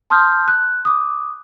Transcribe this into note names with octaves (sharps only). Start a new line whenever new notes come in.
A5 C6 D#6 F6 G6
F#6
D6 D#6